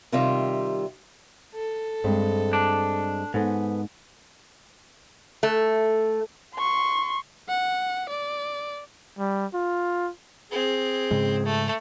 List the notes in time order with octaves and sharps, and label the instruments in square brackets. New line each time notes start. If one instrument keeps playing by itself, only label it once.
[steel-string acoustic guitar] C3 D#3 G3 F4 E5
[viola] A4
[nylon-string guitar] G2 G#3 C4
[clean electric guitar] D4
[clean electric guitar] G#2 [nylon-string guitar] B3 A4 C5
[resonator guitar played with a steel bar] A3
[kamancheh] C6 C#6
[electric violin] F#5
D5
[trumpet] G3
F4
[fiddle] C4 [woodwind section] G#4
[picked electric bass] G#2 C#3 G#3
[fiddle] A3